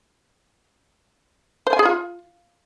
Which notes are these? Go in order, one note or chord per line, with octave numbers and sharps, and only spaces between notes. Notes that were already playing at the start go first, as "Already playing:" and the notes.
C5
G#5
G#4
F4